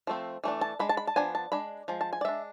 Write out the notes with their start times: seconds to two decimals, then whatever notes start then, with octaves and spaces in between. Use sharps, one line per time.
0.07 F3 A3 C4
0.44 E3 A3 D4
0.61 A5
0.79 G#3 D4 B5
0.89 A5
0.97 B5
1.07 A5
1.16 F3 B3 D4 G#5
1.35 A5
1.52 G#3 D4 B5
1.88 F3 G#3
2.01 A5
2.13 G#5
2.21 D5
2.25 G#3 D4 E5